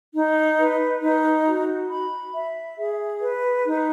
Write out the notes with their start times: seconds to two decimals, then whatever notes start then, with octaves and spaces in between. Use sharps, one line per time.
0.15 D#4
0.58 B4
1.03 D#4
1.46 F#4
1.90 B5
2.34 E5
2.79 G#4
3.22 B4
3.67 D#4